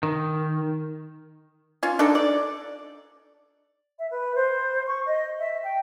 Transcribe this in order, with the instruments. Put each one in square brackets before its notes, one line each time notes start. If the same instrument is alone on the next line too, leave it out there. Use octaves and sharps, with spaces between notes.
[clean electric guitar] D#3
[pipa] C#4 F4
D4 D#4 A4
D5
[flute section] E5
B4
C5
C#6
D#5
E5
G5